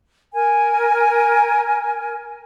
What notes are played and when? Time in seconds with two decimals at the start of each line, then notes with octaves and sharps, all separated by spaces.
0.33 A#4 G#5